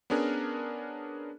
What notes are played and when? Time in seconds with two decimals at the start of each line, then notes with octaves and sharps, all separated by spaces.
0.10 B3 C#4 D4 G#4 A#4